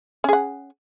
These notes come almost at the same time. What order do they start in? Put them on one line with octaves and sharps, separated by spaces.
C#4 G#4 F#5